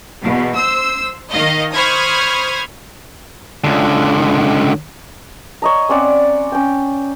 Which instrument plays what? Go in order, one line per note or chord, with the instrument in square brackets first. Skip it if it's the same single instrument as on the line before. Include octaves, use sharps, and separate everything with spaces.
[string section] E2 B2
C5 E6
D#3 D#5 F5
C5 B5 C#6 D#6 F6 G#6
[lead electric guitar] C#2 D3
[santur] C#5 D#5 A#5
C4 C#4 D5 F#5
C#4 G5